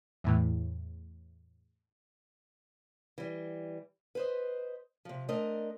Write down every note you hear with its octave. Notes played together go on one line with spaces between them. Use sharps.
E2 A2 E3
E3 G3
B4 C5 D#5
C3 F3
A3 C4 D4 A#4 D#5